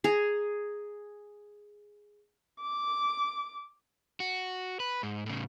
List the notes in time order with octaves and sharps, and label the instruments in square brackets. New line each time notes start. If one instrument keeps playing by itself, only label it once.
[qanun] G#4 A#5
[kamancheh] D6
[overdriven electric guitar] F#4
B4
G#2
A2 C#3